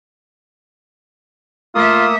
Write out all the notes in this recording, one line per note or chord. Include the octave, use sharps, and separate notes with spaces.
A3 A#3 F4 E5 D#6